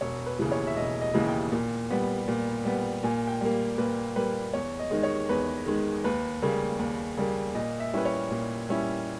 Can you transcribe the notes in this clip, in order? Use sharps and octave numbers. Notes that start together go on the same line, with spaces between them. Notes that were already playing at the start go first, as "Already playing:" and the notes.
E1 C#5
B4
D#2 C#3 E3
C#5
E5
E1 D#5
D#5
D#2 C#3 E3
G5
A#2
G3 B3
A#2
G3 B3
A#2 G#5
G5
G3 A#3
A#2 B4
G3 A#3 B4
E2 C#5
D#5
D#3 G#3
C#5
E2 B4
D#3 G#3
D#2 B4
C#3 G3 A#3
D#2
C#3 G3 A#3
A#2 D#5
E5
G3 C#4 E4 B4
C#5
A#2
G3 C#4 E4